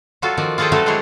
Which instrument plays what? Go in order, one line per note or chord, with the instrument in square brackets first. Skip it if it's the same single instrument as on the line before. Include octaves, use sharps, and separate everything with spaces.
[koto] F#3 G3 F4 F#4 A4
D#3 F3 F#4 D5
F4 G#4 A4 C5 D#5 G5
F#3 G3 A3 F#4 A4 B4
G#3 D4 E4 C5 C#5